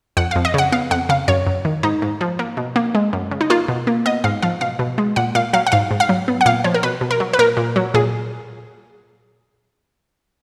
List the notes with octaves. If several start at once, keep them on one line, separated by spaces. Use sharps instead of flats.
F2 F#5
F5
F2
D#5
C#3 F#5
B3 F5
F2 F#5
C#3 F5
F#2 C#5
F#2
D#3
G#2 D#4
G#2
F3
A#3
B2
A#3
G#3
F#2
C#3
D#4
A#3 F4
B2
A#3
B3 D#5
G#2 F5
F3 F5
B2 F5
B2
G#3
A#2 F#5
A#2 F5
F#3 F5
F#5
G#2 F5
G#2
F5
F#3
B3
F#5
A#2 F5
F3 C#5
A#4
B2 B4
B2
A#4
F#3
B4
A#2 A#4
A#2
F#3
A#2 G#4